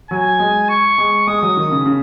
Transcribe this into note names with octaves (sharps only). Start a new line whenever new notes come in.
F#3 G#5
G#3
C#6
G#3
G#3 D#6
F#3
D#3
C#3
C#3